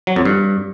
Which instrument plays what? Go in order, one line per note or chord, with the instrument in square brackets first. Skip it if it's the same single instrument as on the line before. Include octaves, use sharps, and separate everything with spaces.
[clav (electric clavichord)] F#3
F2
G2